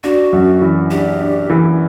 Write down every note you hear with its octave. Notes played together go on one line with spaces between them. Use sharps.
D4 F#4
F#2
E3
D4 G4
D4
E3